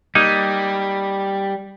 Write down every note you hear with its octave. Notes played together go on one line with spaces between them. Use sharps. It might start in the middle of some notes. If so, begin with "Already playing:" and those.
G3 A#3 D#4